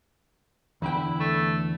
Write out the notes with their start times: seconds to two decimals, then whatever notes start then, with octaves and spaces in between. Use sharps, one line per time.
0.82 E2 D3 E4 G5
1.20 A3